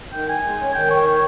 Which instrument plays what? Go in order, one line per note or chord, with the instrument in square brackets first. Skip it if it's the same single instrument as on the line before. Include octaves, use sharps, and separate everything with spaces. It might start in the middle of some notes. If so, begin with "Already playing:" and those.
[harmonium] D#3 [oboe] G5
[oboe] G#5
[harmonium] G#3
C#4
[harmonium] D#3 [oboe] G5
[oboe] C#5
C#5